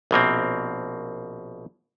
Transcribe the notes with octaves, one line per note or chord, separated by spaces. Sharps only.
A#1 B2 A#3 C4